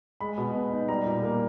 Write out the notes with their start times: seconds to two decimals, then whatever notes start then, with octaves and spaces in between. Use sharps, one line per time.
0.21 G#3 B5
0.37 B2
0.55 B3
0.72 D#4
0.88 G3 A#5
1.05 A#2
1.23 A#3